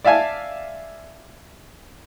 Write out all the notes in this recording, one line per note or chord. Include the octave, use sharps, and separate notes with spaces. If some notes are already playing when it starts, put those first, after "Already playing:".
D5 E5 F5 G#5 A5